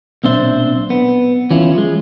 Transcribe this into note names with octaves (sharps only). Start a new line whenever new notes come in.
B1 A#2 C4 D4 C5 E5
B3
E3 C#4 E4 F4
F3 G#3